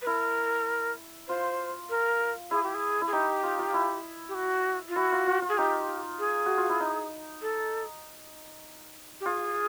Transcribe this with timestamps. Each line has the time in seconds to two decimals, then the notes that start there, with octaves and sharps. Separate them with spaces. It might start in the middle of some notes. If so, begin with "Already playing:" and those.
0.02 B4
0.07 E4 A#4
1.28 F4 C5
1.90 A#4
2.51 E4 G#4
2.63 G4
2.75 G#4
3.02 E4
3.07 G#4
3.13 D#4 G4
3.43 F4
3.59 F4
3.74 E4
4.29 G4
4.35 F#4
4.89 F4
4.96 E4 F#4
5.12 F4
5.27 F4
5.42 F4
5.49 G#4
5.57 D#4 G4
6.19 G#4
6.46 F#4
6.58 F4
6.70 E4
6.80 D#4
7.42 A4
9.21 G4
9.26 F4 G#4